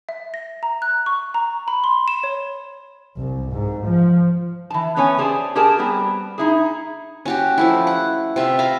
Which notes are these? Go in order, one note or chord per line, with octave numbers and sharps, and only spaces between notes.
E5
A#6
A#5
F#6
C#6
A#5
B5
C6
E7
C#5
C2
G#2
F3
E3 A5
C#3 B3 C#4 C#5 G#5
G4 G#4 C5 D5 G#5 A5
G4 G#4 A#4 D5 A5
G3 B3 C4 G4
D#4 E4 G#4
C#4 F#4 G4
F3 A3 E4
F#5
C3 F4 E5
F5 A#5 B5